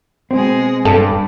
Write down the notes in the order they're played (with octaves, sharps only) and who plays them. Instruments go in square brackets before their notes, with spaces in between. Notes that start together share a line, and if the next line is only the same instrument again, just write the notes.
[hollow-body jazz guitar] B2 C4 [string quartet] G#3 G#4
[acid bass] G2 [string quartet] G3 [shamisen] A4